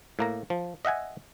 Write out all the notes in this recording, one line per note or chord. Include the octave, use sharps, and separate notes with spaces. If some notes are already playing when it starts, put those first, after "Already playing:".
A2 A#3 A#5
F3
D#5 E5 F#5 G#5